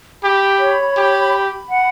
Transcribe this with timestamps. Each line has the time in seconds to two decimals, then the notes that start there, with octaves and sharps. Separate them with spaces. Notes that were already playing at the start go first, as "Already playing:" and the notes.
0.23 G4 B5
0.60 C#5
0.97 G4 B5
1.33 B5
1.71 F#5